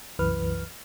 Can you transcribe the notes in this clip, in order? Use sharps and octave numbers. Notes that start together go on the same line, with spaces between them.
C2 F#2 E3 B4 F6